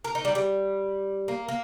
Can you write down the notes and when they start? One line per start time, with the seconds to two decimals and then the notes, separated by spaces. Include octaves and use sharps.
0.04 A#4
0.15 D#4
0.25 G3
0.35 G3
1.28 A#3
1.49 A#3